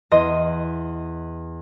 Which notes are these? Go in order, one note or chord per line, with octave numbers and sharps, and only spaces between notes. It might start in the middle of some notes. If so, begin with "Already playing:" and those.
E2 D#5 C6 D#7